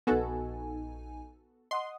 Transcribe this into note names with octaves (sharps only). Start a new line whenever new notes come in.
A#1 B3 D#4 F#4 A4 G#5
D#5 F#5 C6 D#6